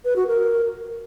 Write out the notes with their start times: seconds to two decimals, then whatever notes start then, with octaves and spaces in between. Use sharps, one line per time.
0.05 B4
0.16 F#4
0.27 A#4